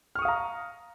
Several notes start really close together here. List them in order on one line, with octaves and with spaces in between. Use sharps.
F6 C#6 D#6 F5 A#5